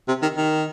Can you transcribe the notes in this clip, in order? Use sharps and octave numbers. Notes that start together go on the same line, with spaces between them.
C3
D#3
D#3